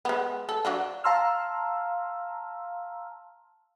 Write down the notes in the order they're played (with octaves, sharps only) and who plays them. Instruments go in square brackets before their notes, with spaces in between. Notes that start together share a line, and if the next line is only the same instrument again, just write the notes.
[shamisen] G#3 B3
A4
F#3 D4 F4
[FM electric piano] F5 A5 A#5 C6 E6 F6